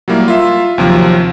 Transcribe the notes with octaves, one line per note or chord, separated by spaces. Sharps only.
F#3 G3 A#3 E4
F4 E5
D#2 C3 F3 F#3